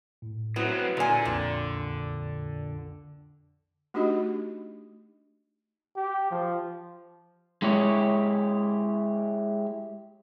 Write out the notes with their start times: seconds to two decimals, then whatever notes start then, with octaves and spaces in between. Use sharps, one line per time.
0.22 A2
0.56 F#3 B3 C4 E4 F#4 B4
0.97 A#2 D3 G#5
1.25 B1 F2 A#2 G5
3.94 A3 D4 D#4 F#4 G4 D#5
5.96 G4
6.31 F3
7.62 G#3 E4 G4 C#5